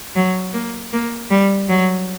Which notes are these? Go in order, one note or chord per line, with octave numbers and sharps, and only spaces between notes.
F#3
A#3
A#3
G3
F#3